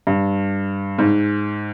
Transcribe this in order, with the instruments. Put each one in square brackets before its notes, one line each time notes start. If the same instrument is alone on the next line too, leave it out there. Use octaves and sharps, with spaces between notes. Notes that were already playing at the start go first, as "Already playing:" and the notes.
[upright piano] G2
G#2